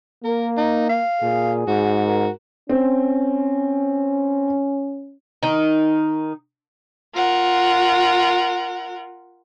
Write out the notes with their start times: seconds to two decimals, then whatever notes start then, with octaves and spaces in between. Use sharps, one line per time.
0.24 A#3 A#4
0.57 D#4
0.89 F5
1.22 A#2 G#4
1.68 G#2 F#4
2.06 A#4
2.69 C4 C#4
5.43 D#3 D#4
7.14 F4 A#4 F#5